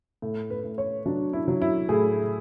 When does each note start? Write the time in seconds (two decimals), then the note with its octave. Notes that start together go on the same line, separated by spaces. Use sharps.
0.22 A2
0.50 B4
0.64 A2
0.78 C#5
1.06 F#3 D4
1.33 E4
1.48 F#3
1.62 E4
1.89 A2 G#4